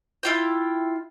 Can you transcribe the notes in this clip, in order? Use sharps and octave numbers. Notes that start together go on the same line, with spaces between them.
E4 F4 G5